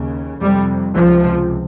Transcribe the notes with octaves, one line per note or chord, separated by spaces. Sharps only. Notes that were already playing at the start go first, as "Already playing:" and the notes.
Already playing: D#2 C#3
F2 C3 G3
C#2 C3 F3